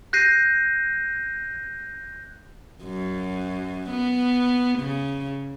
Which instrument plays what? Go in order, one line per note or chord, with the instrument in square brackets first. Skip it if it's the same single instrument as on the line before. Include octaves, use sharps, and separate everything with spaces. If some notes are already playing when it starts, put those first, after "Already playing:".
[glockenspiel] F#6 G6 A#6 C7 D#7
[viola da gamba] F#2
B3
C#3